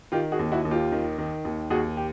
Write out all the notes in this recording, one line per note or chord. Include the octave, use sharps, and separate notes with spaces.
D#3 F4 G4
F#4 G#4
D#2
E4 F#4
D#2
F4 G4
D#3
D#3
D#2
D#2 F#4 G#4
G4